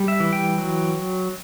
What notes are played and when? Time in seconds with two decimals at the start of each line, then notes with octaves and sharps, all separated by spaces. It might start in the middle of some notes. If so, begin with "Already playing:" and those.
Already playing: G3
0.08 E5
0.20 E3
0.33 G5
0.58 F#3